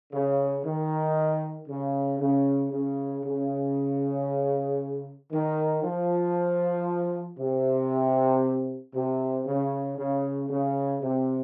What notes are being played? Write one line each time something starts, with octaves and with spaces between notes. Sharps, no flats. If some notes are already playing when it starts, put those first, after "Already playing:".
C#3
D#3
C#3
C#3
C#3
C#3
D#3
F3
C3
C3
C#3
C#3
C#3
C3